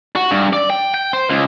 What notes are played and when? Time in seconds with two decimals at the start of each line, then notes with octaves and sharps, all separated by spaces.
0.16 F#4
0.31 G2
0.53 D5
0.70 G5
0.94 G5
1.13 C5
1.29 C#2